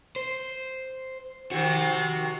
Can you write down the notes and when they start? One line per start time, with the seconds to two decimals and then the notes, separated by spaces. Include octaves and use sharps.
0.16 C5
1.51 C3 D#3 F3 F#4